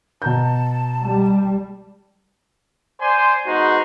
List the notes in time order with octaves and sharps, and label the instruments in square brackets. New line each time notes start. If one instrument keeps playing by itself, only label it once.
[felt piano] B2 A#5 G6 [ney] A5
[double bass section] G3
[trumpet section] C5 D5 G#5 C6
G#3 B3 D#4 F#4 C5